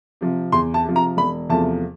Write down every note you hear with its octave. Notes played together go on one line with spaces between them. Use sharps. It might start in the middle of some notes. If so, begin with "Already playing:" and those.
C3 F3
E2 C6
A5
C3 F3
A#5
E1 B5
E2 C3 F3 A3 A5